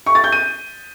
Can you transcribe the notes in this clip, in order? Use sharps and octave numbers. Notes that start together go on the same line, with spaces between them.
C#6
A6
G6
D#7